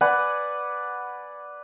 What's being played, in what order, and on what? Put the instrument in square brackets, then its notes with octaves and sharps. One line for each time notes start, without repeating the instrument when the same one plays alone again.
[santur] B4 D5 F#5 G#5